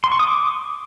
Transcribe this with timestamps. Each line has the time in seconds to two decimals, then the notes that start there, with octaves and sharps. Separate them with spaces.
0.04 C6
0.12 C#6
0.19 D#6
0.27 D6